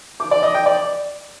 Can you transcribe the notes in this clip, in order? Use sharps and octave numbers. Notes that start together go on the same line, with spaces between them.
D6
D5
D#5
G5
D5